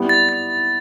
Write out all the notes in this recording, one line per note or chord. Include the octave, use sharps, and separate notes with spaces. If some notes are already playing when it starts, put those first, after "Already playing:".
Already playing: G3 B3 E4
A6
A6